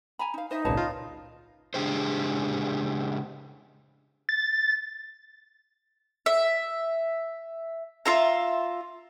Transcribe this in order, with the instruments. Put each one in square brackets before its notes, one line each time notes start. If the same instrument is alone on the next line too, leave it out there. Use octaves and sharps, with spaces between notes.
[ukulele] G#5 A#5 B5
D#4 F5
[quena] D#4 [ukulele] C5 D#5 E5
[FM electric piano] G#1 C#2 A#2 [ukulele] B4 C#5 A5
[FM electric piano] F4
[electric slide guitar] C#3 G#3 D4 G4 G#4 C5
[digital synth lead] A6
[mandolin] E5
F4 E5 A#5